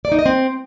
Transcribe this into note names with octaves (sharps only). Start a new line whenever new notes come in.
D5
D#4
D#5
C4